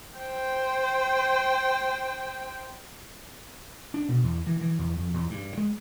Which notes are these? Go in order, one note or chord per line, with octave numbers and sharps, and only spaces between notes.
C5 G5
D4
B2
E2
E3
E3
E2
F2
E2
G2
G#3